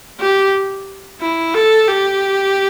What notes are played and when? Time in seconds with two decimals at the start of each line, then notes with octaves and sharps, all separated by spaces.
0.20 G4
1.21 E4
1.54 A4
1.87 G4